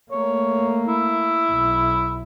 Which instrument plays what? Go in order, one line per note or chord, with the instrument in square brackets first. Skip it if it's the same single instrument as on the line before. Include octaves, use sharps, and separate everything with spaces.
[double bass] A3 A#3 [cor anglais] C#5
[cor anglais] E4
[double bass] B1